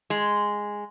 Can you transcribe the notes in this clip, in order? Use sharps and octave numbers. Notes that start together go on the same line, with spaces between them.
G#3